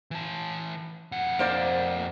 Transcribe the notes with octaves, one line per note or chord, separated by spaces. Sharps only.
E3 A5
F2 F#5
A#3 C5 D5